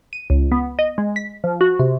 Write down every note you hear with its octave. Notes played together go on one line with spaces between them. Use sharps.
D#7
C#2
B3
D#5
G#3
B6
F3
F#4
C3